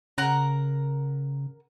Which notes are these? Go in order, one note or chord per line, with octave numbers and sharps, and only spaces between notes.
C#3 A#4 F#5 A#5